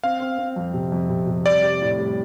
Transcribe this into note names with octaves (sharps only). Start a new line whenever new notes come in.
C4 F5
C4
C4
F2
C3
F2
C3
C3
G3 D5
G3
A2
G3